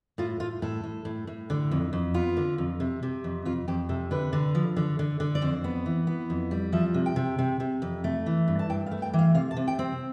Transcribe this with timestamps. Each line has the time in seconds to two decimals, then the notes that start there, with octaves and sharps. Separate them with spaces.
0.18 A2 F4
0.40 A2 F4
0.62 A2 A4
0.84 A2
1.05 A2
1.27 A2
1.50 D3
1.71 F2
1.93 F2
2.14 B3 F4
2.37 D3
2.58 F2
2.80 C3
3.03 C3
3.24 F2
3.45 F2 F4
3.68 F2 G4
3.89 C3 A4
4.11 D3 B4
4.33 D3
4.55 F3
4.76 D3
4.99 D3
5.20 D3
5.35 D5
5.41 F2 C5
5.64 B3
5.86 E3
6.07 B3
6.30 F2
6.51 G3
6.73 F3 E5
6.94 C3
7.06 G5
7.16 C3
7.39 C3
7.60 C3
7.82 F2
8.04 A3
8.26 E3
8.48 G2
8.59 A5
8.70 G2 G5
8.86 F5
8.91 A3
9.02 G5
9.13 E3
9.19 F5
9.35 C3 F5
9.51 A5
9.57 C3
9.68 G5
9.79 C4